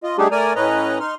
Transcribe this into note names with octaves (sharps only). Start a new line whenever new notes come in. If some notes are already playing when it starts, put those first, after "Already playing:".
F4 D#5
G3 A3 D4 D#4 G4 G#4
A3 A#4 D5 G#5 A#5
A2 C#4 B4 D#5 A#5
D#4 C6 F6